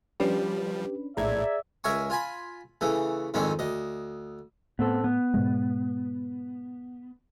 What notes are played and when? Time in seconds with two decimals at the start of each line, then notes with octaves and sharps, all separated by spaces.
0.20 F3 G3 C#4 D4 G4 B4
1.17 A#1 A2 G#4 D5 E5 A#5 G#6
1.84 C#2 A#4 E5 G#5 C#6
2.10 F4 G#5 B5
2.81 C#3 E3 A3
3.34 F2 G#2 D3 D#3 C4 C#4
3.59 D2 D#5
4.79 A2 B3 C4 A4
5.04 B3
5.34 G#2 B2 G#3